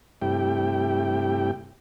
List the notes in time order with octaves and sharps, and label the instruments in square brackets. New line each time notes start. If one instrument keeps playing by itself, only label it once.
[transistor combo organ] G2 C3 A3 E4 G4 G5